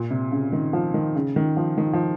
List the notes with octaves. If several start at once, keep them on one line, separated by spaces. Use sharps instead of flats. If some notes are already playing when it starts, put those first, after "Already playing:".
Already playing: A#2
C3
C#3
D#3
F3
D#3
C#3
D#3
F3
D#3
F3